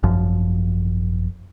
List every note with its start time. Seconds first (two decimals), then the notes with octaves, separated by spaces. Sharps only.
0.03 G#1 F#2 F3